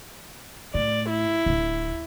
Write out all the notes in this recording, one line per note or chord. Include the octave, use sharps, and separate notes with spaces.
A2 D5
E4
D1